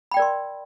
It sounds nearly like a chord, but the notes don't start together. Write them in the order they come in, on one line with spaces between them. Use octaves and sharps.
B5 G5 D5 A#4 C6